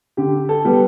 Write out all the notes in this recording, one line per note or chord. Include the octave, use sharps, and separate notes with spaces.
D3 G4
A4
G3 B3